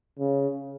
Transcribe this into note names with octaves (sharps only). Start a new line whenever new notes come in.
C#3